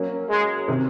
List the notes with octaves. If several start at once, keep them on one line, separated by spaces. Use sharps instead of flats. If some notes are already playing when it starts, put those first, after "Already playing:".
Already playing: F#3 A#3 C#4
G#3
C3 D#3